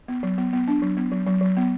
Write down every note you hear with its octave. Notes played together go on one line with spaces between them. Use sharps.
B3
F#3
B3
B3
D4
F#3
B3
F#3
F#3
F#3
B3